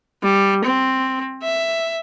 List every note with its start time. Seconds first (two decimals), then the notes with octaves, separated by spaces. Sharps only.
0.23 G3
0.65 C4
1.43 E5